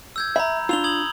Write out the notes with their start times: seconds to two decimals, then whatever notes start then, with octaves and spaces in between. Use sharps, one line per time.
0.16 E6 G6 G#6
0.36 E5 A#5 B5
0.69 D4 F4 E6 F7 G7
0.84 D#6 G#6 F#7